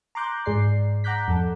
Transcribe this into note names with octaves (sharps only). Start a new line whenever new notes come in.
A#5 C6 D6 F#6 G6
G#2 G#4 D5 C7
F#5 A#5 D6 F#6 G6 B6
F2 A4